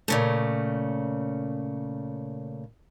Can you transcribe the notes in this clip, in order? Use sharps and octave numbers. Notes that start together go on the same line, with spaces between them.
A#2 C#3 A3